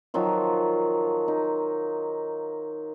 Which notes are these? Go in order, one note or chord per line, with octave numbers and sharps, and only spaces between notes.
D#3 F3 F#3 F4
D#4